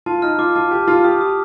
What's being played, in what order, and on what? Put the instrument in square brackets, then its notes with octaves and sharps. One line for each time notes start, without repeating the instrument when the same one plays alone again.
[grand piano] F4 [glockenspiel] A5
[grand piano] D#4 [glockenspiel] F6
[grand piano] F4 [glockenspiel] D6
[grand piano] F4 [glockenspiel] A5
[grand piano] G4 [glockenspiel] A5
[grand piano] F4 [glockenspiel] A5
[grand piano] G4 [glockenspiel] D#6
[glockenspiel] D#6